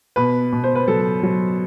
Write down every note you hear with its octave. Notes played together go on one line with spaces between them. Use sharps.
B2 B4
B2
C5
B4
F#3 A4
F#3